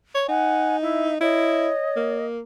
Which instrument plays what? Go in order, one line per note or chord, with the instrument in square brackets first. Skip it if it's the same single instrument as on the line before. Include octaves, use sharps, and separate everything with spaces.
[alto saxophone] C#5
[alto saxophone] D#4 [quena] F#5 [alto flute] G#5
[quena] E4 [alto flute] E5
[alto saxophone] E4 [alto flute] C#5 [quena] D#5
[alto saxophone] A#3